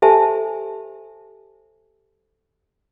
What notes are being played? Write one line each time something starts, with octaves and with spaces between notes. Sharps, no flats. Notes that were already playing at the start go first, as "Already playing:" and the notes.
G4 A4 C5 E5 G#5 A5